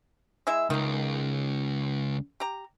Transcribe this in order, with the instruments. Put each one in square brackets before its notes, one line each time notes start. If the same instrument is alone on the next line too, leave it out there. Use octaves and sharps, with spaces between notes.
[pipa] G#3 E4 E5
[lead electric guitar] C#2 [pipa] D#3 A#3
[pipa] G4 A#5